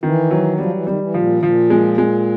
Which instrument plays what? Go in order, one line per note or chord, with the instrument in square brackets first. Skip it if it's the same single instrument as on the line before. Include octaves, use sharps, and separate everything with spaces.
[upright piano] D#3 [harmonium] E3
[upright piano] F#3
[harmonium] F3 [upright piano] G3
[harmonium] E3
[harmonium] D#3 [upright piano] G3
[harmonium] E3
[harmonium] A#2 [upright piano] F3
[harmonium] A#2 [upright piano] F3
[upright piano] G#3
G#3